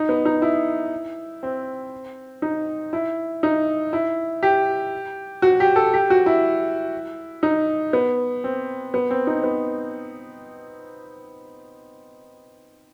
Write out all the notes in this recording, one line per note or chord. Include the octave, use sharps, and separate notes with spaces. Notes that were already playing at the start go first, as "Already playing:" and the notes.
Already playing: D#4
B3
D#4
E4
C4
D#4
E4
D#4
E4
G4
F#4
G4
A4
G4
F#4
E4
D#4
B3
C4
B3
C4
D#4
B3